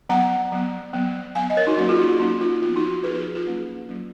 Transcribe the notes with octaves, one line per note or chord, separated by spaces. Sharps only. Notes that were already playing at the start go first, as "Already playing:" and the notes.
F#3 B3 F#5 A#5
F#3 B3
F#3 B3
F#3 B3 F5 G#5
D#5
A#4 C#5
D#4 F#4
F#3 A#3 C#4 D#4 F#4
F4 G#4
D#4 F#4
F4
F#3 A#3 C#4 D#4
F4
F3 B3 F4
D#4 F#4
F3 B3 G#4 B4
G#4 B4
F4 G#4
F#3 A#3 C#4
F#3 A#3 C#4